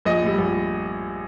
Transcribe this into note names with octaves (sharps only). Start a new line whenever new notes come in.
A#1 D#5
A2 G3
A#1